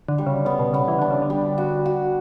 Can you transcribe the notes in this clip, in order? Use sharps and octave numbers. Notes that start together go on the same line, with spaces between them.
D3
G3
C#3
C#3 B3
B2
C#3 B3
E3
D3 D4
C#3
D3
G3
F#4
F#4